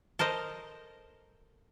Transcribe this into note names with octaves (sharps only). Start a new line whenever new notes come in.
A4 A#4 C5 D#5